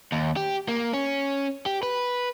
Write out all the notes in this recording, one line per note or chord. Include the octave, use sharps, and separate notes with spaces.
D#2
G4
A#3
C#4
G4
B4